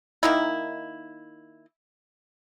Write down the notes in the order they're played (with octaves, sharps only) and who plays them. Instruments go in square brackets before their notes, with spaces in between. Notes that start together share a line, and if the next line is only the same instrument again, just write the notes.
[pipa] D#3 A#3 D#4 E4